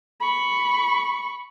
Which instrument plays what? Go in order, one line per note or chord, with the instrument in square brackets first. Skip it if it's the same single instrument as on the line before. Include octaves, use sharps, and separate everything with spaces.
[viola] B5 C#6